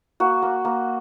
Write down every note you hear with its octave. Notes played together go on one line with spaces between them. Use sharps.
A#3 F#4
A#3
A#3